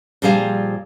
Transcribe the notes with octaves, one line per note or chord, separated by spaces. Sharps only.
A#2 F3 G3 G#4 F5